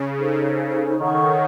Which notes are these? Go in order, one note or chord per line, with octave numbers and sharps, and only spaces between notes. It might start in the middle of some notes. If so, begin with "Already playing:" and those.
Already playing: C#3
D#4 A4 C5
D#3 A4 C#5 F#5 C#6